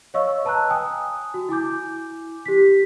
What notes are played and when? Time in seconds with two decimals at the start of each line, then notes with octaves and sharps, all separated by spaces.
0.14 C#5 D#5 F5 C#6 E6
0.45 B4 A5 A#5 E6 F#6
0.70 G5 G#5 D#6
1.34 F#4
1.49 E4 G#5 D6 G6
2.46 G4 B6